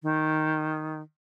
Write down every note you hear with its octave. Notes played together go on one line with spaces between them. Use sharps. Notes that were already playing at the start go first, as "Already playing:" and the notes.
D#3